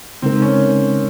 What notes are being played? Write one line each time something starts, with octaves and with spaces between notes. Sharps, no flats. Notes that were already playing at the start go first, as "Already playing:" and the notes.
C#3 G#3 C4 D#4 A#4
C#4